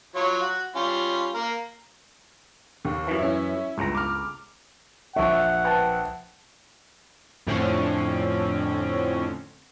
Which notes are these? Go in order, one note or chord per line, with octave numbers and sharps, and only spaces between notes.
F#3 F4 C#5
F#4
G3 C#4 F4
A#3 A#4
D#2
F#2 E3
C#4 E4
G1 C#2 A#5
D6 F6
A#1 E5 F#5 C#6
B4 G5 A5
F2 A2 D3 C4 C#4